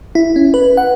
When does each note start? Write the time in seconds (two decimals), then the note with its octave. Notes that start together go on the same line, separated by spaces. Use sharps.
0.15 E4
0.36 C#4
0.54 B4
0.77 F#5